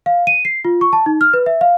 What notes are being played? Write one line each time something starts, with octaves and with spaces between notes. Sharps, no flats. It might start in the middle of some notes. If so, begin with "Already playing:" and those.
F5
D#7
C7
F4
C#6
A5
D#4
F6
B4
E5
F5